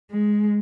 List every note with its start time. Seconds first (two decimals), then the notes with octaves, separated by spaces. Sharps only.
0.11 G#3